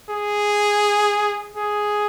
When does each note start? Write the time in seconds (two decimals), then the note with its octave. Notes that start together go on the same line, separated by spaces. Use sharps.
0.10 G#4
1.56 G#4